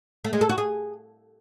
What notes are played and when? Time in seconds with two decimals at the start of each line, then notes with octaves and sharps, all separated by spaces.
0.24 A3
0.33 G#3
0.41 A4
0.49 F#4
0.58 G#4